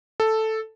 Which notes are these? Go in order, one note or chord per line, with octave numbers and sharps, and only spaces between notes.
A4